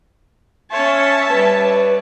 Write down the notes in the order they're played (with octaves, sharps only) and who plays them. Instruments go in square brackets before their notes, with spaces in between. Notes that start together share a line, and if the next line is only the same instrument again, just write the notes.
[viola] C#4 C#5 [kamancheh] E5 A5
[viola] G3 C#5 [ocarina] B4